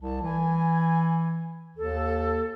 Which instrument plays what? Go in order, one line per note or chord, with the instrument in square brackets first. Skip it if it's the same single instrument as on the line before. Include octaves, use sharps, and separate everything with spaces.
[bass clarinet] C2 [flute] A5
[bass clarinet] E3 [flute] G#5
[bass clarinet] D#2 [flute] A4